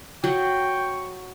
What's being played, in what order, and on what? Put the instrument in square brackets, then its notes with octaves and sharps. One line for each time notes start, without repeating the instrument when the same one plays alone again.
[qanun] F#3 F#5 [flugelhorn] G5 [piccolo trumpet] C#6